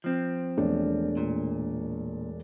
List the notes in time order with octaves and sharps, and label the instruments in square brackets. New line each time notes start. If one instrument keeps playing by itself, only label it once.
[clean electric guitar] F3 C4
[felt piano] E1 A3 D4
[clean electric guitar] A#2